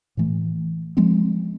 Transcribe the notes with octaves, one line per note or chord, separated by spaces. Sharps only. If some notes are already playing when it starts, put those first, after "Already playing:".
A2 E3 A3
F3 G#3 C4